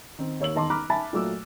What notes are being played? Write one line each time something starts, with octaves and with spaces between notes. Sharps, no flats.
D#3 C4
D#2 C#5 E6 F#7
E1 D#3 D#5 A5 C6 D6
A#5 B5 D6 F6 F#6
E5 G#5 A5 B5 A6
A#2 F#3 A3 D6 E6